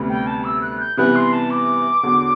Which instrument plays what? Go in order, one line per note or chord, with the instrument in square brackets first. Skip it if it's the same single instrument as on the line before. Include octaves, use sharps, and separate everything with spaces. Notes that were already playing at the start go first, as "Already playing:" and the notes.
Already playing: [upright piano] D2 C3 G3 B3
[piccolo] G5
A5
E6
F#6
G6
[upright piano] C3 E3 G3 B3 [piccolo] F#6
[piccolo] C6
A5
D6
[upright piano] E2 D3 F#3